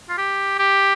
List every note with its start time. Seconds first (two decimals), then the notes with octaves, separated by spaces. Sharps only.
0.09 F4
0.18 G4
0.59 G4